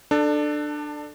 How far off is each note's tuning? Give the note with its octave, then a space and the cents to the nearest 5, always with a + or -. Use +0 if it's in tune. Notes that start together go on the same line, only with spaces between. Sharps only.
D4 +20 A4 +0